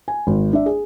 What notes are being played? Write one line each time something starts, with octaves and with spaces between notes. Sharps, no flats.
G#5
G#1
D4 E5
G#4